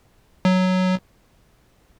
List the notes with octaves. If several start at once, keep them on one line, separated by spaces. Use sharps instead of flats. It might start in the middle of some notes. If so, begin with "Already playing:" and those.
F#3